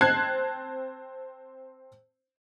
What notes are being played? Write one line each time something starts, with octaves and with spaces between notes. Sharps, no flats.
C4 A5 F#6 G#6 C7